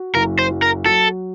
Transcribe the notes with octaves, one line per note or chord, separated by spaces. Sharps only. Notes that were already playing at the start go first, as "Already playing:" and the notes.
Already playing: F#4
F#1 A#4
C5
F#3
A#4
F#3 A4